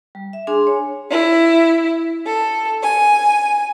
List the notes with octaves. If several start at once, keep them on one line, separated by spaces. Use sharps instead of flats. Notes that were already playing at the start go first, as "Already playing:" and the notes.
G3
E5
D4 G#4 G#5 C6
C#5
E4
A4
G#5